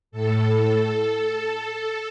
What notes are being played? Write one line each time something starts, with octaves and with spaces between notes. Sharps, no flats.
A2 A4